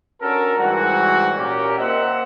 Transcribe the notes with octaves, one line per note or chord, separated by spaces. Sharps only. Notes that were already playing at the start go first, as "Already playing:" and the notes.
C#4 D4 F#4 A4 A#4
G#2 E3 G3 A#3 C4 F#4
A#2 C#4 G4 A#4
A#3 C4 D#5 E5 F#5